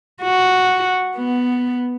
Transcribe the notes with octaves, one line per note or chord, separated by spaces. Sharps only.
F#4
B3